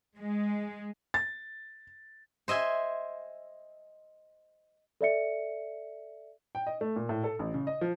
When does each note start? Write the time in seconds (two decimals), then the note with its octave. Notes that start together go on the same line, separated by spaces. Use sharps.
0.17 G#3
1.14 A6
2.48 C5 D#5 E5 G#5
5.01 A4 D5 E5 C#7
6.55 G5
6.67 D#5
6.81 A3
6.96 A#2
7.09 A2
7.24 A4
7.39 A1
7.54 C#3
7.67 D#5
7.81 F3